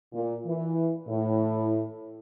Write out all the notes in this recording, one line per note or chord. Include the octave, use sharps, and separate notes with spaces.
A#2
E3
A2